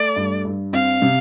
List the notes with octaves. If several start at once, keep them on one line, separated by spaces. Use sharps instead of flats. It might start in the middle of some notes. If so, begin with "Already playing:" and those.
Already playing: A3 D5
G2
G2
C4 F5
C3